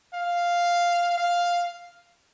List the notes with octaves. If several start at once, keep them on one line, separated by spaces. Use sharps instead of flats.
F5
F5